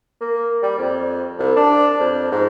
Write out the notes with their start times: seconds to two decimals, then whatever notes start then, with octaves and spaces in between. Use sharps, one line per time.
0.20 A#3
0.62 G3
0.79 F2
1.39 C2
1.56 D4
2.00 F2
2.31 G#2